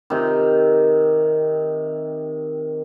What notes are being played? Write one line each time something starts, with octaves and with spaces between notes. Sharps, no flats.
C3 D#3